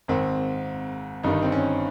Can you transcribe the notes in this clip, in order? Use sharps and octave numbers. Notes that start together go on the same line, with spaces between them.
G#1 G#2 D#3 C4
G1 G2 D#3 D#4
C4
C#4